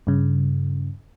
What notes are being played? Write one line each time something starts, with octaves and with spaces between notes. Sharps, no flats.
G2 C#3